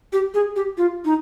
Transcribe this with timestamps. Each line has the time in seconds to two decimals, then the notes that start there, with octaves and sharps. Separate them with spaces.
0.13 G4
0.34 G#4
0.56 G4
0.78 F4
1.05 D#4